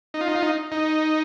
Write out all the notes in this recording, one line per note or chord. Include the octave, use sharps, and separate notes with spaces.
D#4
F4
D#4
F4
D#4
D#4